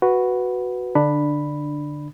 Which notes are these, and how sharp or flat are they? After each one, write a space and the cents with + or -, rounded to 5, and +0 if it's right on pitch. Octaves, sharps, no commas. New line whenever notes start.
F#4 +0 B4 +0
D3 +0 D4 +15 B5 +0